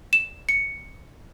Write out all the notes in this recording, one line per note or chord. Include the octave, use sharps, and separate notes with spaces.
E7
C#7